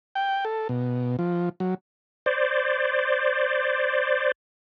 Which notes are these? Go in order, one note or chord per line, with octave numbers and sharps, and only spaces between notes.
G5
A4
B2
F3
F#3
C5 D5